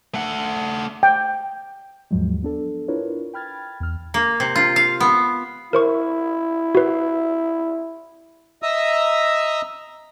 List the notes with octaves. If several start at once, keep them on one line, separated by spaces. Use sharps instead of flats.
A3 F#5
G5
D#2 G#2 F3 F#3 G#3
B3 D4 A4
D4 E4 F4 A#4 B4 C#5
G5 B5 F6 G#6 A6
E2 F6
A#3
C3
F4
F5
B3
E4 A#4 C5 C#6
F#4 B4
D#5 E5 A#5 D#6 E6